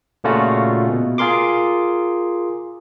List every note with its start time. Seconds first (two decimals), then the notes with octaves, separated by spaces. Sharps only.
0.24 A#2 C#3 A3 C#4 F4 F#4
0.90 B2
1.18 F4 G#4 A#4 C6 D6